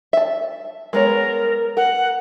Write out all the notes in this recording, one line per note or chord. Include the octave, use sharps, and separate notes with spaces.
E5 A5
G#3 B3 A#4 C#5
A#4 F#5